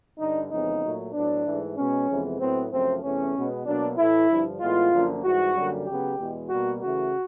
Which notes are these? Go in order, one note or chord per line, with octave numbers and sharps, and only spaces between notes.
G2 D3 G3 D#4
F2 C#3 E3 G#3 B3 D#4
A#2 F#3 A3
A2 F#3 B3 D4
G#2 E3 A3
B2 G#3 B3 C#4
F2 C3 E3 G#3 B3
A2 F#3 B3 C4
F#2 C#3 F3 A3 C4
E2 C3 E3 A3 C#4
B2 G#3 B3
B2 F#3 A#3 D4
A2 E3 A3 E4
G2 D3 F3
A2 E3 G#3 B3 F4
F#2 D3 F3 A#3
G#2 E3 G3 F#4
F#2 D3 G3 A#3
C#3 F#3 B3 G4
E2 B2 G#3
B2 G3 A#3 F#4
C#3 E3 A3 F#4